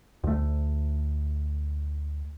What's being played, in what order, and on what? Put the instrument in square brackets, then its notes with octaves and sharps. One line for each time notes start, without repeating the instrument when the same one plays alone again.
[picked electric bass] D2 A3